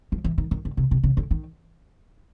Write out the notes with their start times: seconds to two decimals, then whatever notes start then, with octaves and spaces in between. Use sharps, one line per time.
0.12 F3
0.24 E3
0.38 D#3
0.51 D#3
0.65 D3
0.77 C3
0.91 C3
1.03 C#3
1.17 D3
1.31 D#3